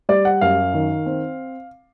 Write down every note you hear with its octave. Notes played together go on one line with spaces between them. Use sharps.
G3 D5
F#5
F#2 F5
D#3
C4